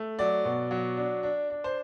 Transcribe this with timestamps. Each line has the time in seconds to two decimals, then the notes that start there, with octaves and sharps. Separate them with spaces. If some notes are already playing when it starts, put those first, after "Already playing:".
Already playing: A3
0.19 F#3 D5
0.45 B2
0.71 F#3
0.97 D4
1.23 D4
1.50 D4
1.64 C5